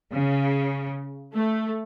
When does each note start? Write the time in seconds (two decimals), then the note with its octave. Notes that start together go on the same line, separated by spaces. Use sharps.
0.12 C#3
1.33 A3